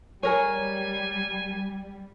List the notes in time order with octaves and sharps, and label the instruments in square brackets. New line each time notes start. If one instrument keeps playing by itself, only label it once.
[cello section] G3 [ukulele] G#4 A#4 C#5 [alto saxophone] G#5